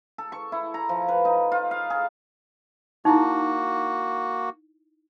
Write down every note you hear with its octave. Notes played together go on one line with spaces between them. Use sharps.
A4
C#6
E4
A#5
F3
B4
D#4
F4
F5
G#4
A#3 D#4 E4 F#4